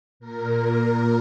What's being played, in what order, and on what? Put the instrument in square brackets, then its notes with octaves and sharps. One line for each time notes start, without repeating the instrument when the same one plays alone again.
[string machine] A#2 A#4
A#4